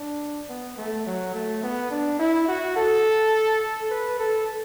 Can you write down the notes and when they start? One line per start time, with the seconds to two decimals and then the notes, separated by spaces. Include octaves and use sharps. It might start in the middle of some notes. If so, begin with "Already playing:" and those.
Already playing: D4
0.49 B3
0.78 A3
1.06 F#3
1.34 A3
1.63 B3
1.91 D4
2.19 E4
2.48 F#4
2.77 A4
3.90 B4
4.19 A4